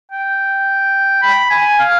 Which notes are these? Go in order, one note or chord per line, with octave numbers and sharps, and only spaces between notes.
G5
B5
G#5
F5